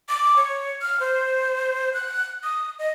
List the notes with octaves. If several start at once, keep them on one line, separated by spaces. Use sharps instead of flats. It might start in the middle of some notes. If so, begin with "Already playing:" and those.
D6
C#5
F6
C5
F#6
D#6
D#5